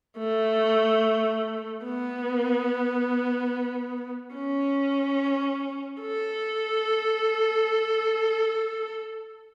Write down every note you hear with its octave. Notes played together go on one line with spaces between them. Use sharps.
A3
B3
C#4
A4